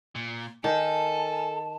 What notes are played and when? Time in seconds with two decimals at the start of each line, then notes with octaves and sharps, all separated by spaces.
0.15 A#2
0.64 D#3 A4 G#5 A5